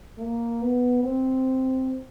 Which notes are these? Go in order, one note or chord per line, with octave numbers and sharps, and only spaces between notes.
A#3
B3
C4